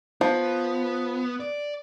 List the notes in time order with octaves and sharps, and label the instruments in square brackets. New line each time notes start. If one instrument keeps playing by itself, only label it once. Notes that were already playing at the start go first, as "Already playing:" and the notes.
[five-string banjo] F3 [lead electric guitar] B3
[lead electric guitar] D5